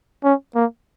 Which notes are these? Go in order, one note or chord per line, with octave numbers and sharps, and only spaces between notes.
C#4
A#3